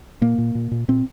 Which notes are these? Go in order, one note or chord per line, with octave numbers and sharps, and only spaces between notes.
A#2 A#3
A#2
A#2
A#2
A#2 C4